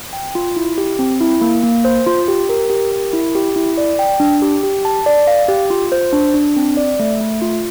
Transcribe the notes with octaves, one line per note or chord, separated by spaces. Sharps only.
G5
F4
E4
G4
C4
E4
A#3
A#3
C5
F4
G4
A#4
G4
A#4
E4
G4
E4
D5
G5
D4
G4
G4
A5
D5
F5
G4
F4
C5
D4
D4
C4
D5
A3
A3
F4